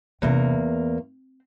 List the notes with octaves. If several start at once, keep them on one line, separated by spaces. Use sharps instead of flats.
E2 C3 A#3 C#4
C4